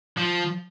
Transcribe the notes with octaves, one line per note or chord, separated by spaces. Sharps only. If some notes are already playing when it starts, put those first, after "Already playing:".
F3